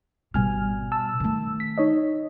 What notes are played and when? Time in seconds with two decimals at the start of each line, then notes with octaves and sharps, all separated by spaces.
0.34 G#1 B2 G3 G#5 F6
0.92 A5 E6
1.20 D#3 A3
1.60 B6
1.78 D#4 C#5 D#5